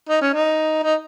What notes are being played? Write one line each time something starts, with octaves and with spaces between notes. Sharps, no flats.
D#4
C#4
D#4
D#4